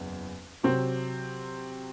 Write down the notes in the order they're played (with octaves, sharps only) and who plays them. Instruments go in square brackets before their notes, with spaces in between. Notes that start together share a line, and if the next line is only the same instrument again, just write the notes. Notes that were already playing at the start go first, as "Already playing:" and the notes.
Already playing: [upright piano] F#1 E2
C3 F#3 C4